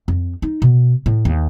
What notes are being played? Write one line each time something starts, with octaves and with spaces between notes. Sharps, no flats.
F2
D#4
B2
A2
D#2